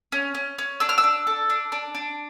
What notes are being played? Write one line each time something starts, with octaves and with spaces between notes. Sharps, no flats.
C#4
C#4
C#4
D4 E6
F6
E6
D4
A4
D4
D4
D4